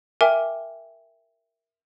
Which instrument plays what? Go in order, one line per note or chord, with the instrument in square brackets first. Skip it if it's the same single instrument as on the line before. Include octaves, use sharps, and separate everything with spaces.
[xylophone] A#4 E5 G5 G#5 D6